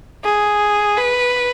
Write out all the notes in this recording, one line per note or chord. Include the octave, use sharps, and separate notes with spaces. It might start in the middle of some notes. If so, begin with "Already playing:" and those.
G#4
B4